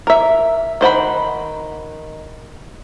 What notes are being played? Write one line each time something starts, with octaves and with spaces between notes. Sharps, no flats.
A#4 E5
D#3 C5 F#5 B5